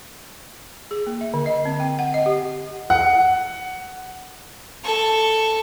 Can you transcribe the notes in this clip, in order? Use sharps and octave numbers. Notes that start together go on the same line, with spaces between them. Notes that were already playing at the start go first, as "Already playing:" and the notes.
G#4
A#3
E5
D3
D#5
C4
G5
F#5
D#5
G4
F#5
A4 C#6